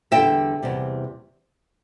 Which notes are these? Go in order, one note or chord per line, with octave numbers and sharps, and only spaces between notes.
E2 D3 G3 E5 G5
E2 C3 G3